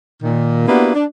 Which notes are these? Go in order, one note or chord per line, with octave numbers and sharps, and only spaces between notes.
A#2 D#3
A#3 B3 D4 E4 F#4 G4
D4